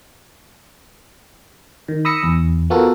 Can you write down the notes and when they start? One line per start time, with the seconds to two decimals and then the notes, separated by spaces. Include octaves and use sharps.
1.88 D#3
2.05 B5 D#6 E6 A#6 C#7
2.23 E2
2.70 B3 F4 F#4 A4 A#4